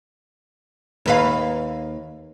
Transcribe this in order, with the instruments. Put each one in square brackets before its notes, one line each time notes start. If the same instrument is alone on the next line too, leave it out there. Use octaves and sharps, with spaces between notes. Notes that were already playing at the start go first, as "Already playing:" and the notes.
[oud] D#2 B4 F5